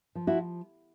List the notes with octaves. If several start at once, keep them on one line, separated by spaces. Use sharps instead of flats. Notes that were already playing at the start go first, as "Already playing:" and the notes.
F3
E4 F#4